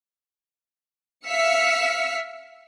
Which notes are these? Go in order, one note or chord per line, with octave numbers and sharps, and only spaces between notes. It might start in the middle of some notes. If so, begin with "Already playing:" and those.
E5 F5 E6 F6 B6 C#7